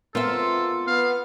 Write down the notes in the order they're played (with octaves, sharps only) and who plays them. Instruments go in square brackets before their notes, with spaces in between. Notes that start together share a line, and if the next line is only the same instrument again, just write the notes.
[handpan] B3 A#4 [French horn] C4 [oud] F4 E5 [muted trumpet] A4
[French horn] B3 [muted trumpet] F5